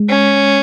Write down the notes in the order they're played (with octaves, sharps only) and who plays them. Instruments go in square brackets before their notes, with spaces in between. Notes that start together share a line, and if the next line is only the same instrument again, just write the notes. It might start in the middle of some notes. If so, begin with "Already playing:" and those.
Already playing: [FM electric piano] G#3
[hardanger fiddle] C#4